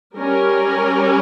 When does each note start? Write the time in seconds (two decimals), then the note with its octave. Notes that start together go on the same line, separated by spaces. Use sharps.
0.16 G3 C#4 A#4